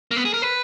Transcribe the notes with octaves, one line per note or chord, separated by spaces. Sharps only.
A#3
B3
G#4
A#4
B4